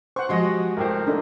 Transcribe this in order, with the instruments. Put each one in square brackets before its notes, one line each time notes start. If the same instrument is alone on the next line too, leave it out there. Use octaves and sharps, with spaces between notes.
[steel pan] C5 F#5 [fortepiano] C#6
[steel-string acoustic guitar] F3 G#3 G4 [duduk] F#4 [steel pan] D#5 C6
[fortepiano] C2 A2 C5 [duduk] A#4
[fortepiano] A3 A#3 [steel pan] D4 D#4 F4